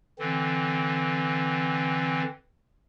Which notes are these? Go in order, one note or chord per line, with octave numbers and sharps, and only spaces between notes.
D3 E3 C4